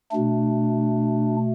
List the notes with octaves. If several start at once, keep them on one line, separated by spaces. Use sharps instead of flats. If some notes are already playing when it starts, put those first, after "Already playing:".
B2 A3 D4